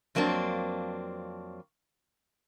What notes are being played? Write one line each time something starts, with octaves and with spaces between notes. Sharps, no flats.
F2 F#3 A#3 C4 D4